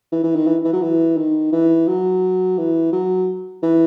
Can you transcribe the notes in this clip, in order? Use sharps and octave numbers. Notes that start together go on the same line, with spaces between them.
E3
E3
D#3
E3
E3
F#3
E3
D#3
E3
F#3
E3
F#3
E3